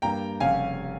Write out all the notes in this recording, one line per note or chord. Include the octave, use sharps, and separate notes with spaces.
G2 G3 A#3 G5 A#5
F1 C#3 G3 C#4 F5 G#5